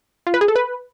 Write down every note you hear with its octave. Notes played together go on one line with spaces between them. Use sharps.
F4
B4
G#4
A4
B4